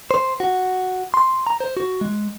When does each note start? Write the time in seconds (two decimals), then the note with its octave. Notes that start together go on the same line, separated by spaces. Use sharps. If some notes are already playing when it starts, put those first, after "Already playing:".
0.11 C5
0.40 F#4
1.14 C6
1.47 A#5
1.60 C5
1.77 F#4
2.01 G#3